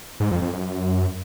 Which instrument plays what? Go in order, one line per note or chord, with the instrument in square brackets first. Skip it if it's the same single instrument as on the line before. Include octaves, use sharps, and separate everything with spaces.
[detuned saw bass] G#2
F2
F2
F#2